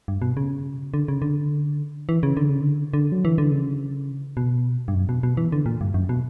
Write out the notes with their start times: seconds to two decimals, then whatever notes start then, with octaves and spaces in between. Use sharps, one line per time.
0.08 G2
0.22 B2
0.37 C#3
0.94 D3
1.08 C#3
1.22 D3
2.09 E3
2.23 C#3
2.37 D3
2.49 C#3
2.61 D3
2.94 D3
3.12 F#3
3.25 E3
3.38 D3
3.51 C#3
4.37 B2
4.88 G2
4.94 F#2
5.09 B2
5.23 B2
5.37 E3
5.52 D3
5.66 A#2
5.81 G2
5.94 F#2
6.09 B2